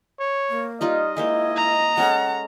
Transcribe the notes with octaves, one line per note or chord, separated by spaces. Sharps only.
C#5
A#3
G3 D#4 F4 D#5
G#3 A#3 E4 C5
A#5
G#3 C#4 A4 F#5